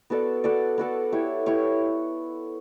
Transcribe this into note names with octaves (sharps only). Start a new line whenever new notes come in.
B3 F#4 A4 D5
B3 F#4 A4 D5
B3 F#4 A4 D5
E4 G4 C#5
E4 G4 C#5